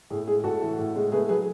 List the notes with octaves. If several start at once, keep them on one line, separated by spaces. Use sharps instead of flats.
A2 G#4
G#3 G#4
A2 F#4 A4
E3
A2
G#3
A3 G#4 B4
F#3 G#4 B4